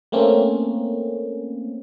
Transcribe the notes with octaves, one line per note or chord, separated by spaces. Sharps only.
A3 A#3 C4 C#4